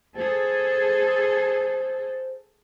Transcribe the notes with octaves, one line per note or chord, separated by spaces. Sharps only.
G#4 A4 C5